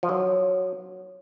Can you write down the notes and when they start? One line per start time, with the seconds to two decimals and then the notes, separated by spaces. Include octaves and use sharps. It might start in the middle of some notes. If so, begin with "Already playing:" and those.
0.03 F3
0.09 F#3